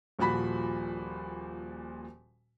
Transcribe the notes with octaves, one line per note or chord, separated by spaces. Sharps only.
D#1 A#2 F3 F#4 B5 B6